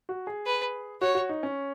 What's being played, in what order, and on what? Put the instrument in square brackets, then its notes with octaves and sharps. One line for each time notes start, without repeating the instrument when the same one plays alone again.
[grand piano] F#4
G#4
[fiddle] B4
[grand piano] F#4 [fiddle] C#5
[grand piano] F#4
D#4
C#4